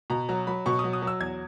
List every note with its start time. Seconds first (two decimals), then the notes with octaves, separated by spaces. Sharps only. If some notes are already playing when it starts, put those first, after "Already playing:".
0.10 B2 A#5
0.29 F#3 A#5
0.47 F#3 B5
0.66 B2 C#6
0.79 F#3 D#6
0.93 D#6
1.02 F#3
1.07 E6
1.20 E2 G#6